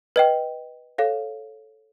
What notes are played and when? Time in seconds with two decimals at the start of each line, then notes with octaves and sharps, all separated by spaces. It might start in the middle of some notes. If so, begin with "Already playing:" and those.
0.16 B4 D#5 G5
0.98 A4 C#5 F5